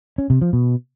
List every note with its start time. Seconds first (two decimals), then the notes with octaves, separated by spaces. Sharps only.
0.18 C#4
0.30 C3
0.41 F3
0.53 B2